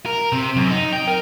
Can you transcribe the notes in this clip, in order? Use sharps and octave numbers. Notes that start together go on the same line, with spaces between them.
A#4
C3
F#2
D#4
G5
A#4